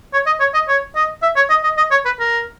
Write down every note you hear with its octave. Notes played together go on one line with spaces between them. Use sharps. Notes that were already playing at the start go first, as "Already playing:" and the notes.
C#5
D#5
C#5
D#5
C#5
D#5
E5
C#5
D#5
D#5
D#5
C#5
B4
A#4